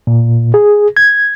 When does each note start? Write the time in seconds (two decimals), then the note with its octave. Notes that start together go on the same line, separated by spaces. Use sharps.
0.07 A#2
0.54 G#4
0.97 G#6